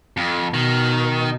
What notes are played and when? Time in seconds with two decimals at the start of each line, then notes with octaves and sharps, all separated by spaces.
0.17 F2
0.54 B2 D#3